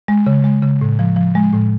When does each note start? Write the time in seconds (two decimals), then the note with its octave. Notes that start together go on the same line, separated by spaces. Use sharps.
0.08 G#3
0.26 C#3
0.44 G#3
0.63 C#3
0.81 A2
0.99 F3
1.16 F3
1.35 G#3
1.53 A2